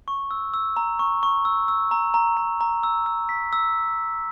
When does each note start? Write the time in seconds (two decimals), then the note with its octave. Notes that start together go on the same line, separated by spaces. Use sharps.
0.08 C#6
0.31 E6
0.54 E6
0.77 A#5
0.99 C#6
1.23 C#6
1.45 E6
1.68 E6
1.91 A#5
2.14 A#5
2.37 A#5
2.61 A#5
2.83 E6
3.06 E6
3.29 B6
3.53 E6